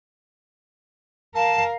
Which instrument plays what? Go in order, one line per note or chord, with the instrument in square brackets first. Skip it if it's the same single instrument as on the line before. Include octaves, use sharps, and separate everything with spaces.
[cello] A#4 F5 [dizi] A5